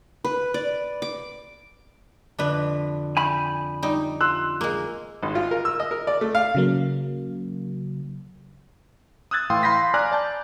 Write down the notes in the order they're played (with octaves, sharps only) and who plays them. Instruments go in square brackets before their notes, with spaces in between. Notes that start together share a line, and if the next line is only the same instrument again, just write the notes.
[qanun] B4
D5
D6
[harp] F2 D3 [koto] D4 B4
[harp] G5 [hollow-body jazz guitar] G#5 B5
[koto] G3 D#4
[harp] F4 [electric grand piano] C6 E6 F#6
[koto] G#3 A#3 [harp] G#4
[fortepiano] G#1
F4
A#4
E6
D#5
A#4
D5
A3
F5
[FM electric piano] C#3 F#3 A#3
[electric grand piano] D#6 E6 F#6 G#6 A6
A2 E3 F5 G5 C6 D#6
F5 B5 C6 G6 A#6 B6
D5 G#5 A#5 D6 F6 F#6
D5 A5 G6